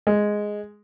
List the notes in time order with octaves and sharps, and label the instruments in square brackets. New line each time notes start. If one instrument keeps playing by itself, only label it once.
[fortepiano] G#3